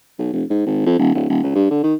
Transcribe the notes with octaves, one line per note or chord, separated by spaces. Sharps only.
B1
F1
G#2
G#1
F2
D#1
D1
D#1
C#2
G2
D3
D#3